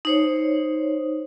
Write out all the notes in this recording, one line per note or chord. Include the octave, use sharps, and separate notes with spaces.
D#4 C5 C#5